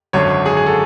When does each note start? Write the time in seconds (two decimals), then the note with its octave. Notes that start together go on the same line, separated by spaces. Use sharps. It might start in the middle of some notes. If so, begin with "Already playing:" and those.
0.13 G#1 F#2 D3 C#5
0.46 G#4
0.57 G#4
0.67 A4